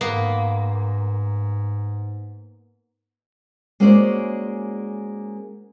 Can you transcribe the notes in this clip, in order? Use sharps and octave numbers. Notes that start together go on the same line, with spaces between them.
G#2 A#3 B3
G#3 A#3 C#4 F#4 C5 D5